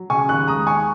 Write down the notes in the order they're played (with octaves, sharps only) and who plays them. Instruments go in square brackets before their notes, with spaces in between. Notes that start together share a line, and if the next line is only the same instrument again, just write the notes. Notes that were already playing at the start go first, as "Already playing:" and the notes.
Already playing: [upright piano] F#3
C#3 G#5 C#6
D#2 C#6 F#6
G#3 A#5 D#6
D#2 G#5 C#6